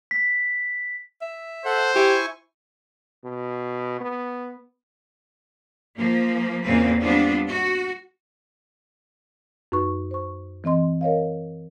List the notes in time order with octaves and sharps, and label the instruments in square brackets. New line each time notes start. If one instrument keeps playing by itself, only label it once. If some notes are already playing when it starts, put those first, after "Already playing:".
[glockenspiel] B6
[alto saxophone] E5
[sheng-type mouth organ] A4 F#5 [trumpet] C5
[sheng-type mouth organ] E4 G#5 C#6 [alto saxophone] G4
[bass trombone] B2
B3
[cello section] F3 A#3
E2 A#2 C#3 A#3 C4 B4
G3 B3 C4 D4 F4
F#4
[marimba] F#2 D#4 B4 C#6
C5 C#6
E3 C4 D#5 C6
A#4 C#5 D#5 F5